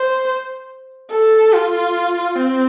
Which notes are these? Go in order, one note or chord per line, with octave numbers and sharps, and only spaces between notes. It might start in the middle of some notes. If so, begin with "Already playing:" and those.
Already playing: C5
A4
F4
C4